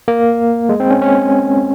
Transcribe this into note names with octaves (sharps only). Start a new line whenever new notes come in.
A#3
G#3
C4
C#4
C#4